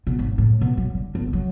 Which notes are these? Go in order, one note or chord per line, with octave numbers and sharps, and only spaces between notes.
B2
G#1
A2
B2
F#3
D3
G1
F#3